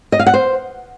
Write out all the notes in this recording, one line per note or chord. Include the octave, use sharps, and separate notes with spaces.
D#5
F5
F#5
C5